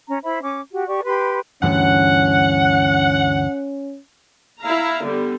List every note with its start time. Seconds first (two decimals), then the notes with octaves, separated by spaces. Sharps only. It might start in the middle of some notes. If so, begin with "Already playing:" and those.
0.08 C#4 A#5
0.23 E4 C5 E5 B5
0.42 C#4 D6
0.71 F#4 G4
0.87 G4 D5 C#6
1.04 G4 B4 B5 C6
1.63 D2 G2 E3 C#4 F#5
4.60 E4 F5 A#5
5.03 D3 G3 B3